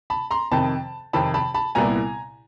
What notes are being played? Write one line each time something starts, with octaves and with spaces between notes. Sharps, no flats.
A5 B5
A#5 C6
F2 C3 D#3 A5 B5
F2 C3 D#3 A5 B5
A5 B5
A5 B5
C2 A#2 G3 B3 E4 G#5 A#5